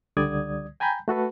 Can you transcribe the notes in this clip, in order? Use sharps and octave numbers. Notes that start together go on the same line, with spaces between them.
C#2 D3 G3 D5 D#6 G#6
G5 G#5 A#5 B5 G6
A3 F#4 A4 B4